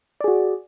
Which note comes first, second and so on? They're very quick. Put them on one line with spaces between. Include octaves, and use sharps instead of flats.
D5 G#4 F#4